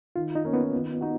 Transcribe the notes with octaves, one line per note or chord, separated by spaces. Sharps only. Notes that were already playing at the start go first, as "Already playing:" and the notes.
D#3 F4
D#4
A#3 C#4
B3
D#3
D#4 F#4